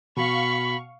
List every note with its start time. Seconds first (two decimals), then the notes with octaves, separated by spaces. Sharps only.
0.17 B2 F5 B5 C#6